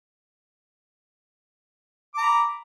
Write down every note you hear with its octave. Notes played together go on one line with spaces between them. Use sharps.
A#5 B5 D6